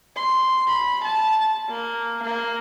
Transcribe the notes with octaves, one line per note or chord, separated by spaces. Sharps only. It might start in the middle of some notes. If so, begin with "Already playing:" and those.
C6
B5
A5
A#3
A#3